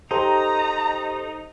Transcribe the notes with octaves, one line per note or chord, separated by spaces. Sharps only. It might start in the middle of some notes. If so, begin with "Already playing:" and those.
D#4 G4 A4 C5 A#5